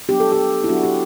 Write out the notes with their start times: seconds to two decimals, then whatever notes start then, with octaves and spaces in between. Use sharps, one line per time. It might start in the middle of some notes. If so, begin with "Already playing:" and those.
0.09 F#3 B3 D4 G4
0.20 A4
0.32 G4
0.64 E4
0.69 F#3 B3 D4 F#4
0.84 G4